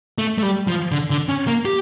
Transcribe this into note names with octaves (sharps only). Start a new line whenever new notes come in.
A3
A3
G3
F3
D3
D3
C#4
A#3
G4